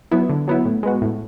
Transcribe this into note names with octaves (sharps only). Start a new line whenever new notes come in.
F#3 B3 E4
D3
F#3 B3 E4
A2
G#3 B3 F#4
A2